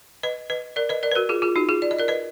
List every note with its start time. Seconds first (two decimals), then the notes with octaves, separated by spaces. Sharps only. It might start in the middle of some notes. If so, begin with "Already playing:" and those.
0.23 B4 D#5
0.50 B4 D#5
0.76 A#4 D5
0.89 B4 D#5
1.03 A#4 D5
1.11 B4
1.16 F#4 A#4
1.29 F4 G#4
1.42 F4 G#4
1.56 D#4 F#4
1.69 F4 G#4
1.82 D5
1.91 D#5
1.99 A#4 D5
2.08 B4 D#5